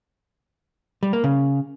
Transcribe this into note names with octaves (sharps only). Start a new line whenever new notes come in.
G3
A#3
C#3